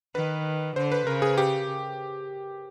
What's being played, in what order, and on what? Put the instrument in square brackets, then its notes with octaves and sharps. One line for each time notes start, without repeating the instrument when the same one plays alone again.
[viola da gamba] D#3 [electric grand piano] B4
[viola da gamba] D3 [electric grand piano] C5
[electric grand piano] B4
[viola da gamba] C#3 [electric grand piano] A#4
[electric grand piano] G#4
G4